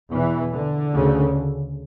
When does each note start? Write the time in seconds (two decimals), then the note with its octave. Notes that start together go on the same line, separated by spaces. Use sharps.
0.12 E2 B2 E3
0.53 D3
0.93 D2 C#3